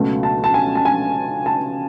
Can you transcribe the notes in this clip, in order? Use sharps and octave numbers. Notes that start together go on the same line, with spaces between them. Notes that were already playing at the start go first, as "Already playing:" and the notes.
Already playing: C#2 B2 F#3 A3
A5
A5
G#5
A5
G#5
A5